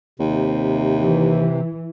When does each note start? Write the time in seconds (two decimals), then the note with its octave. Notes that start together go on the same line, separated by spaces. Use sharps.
0.20 D#2 C3
1.00 E3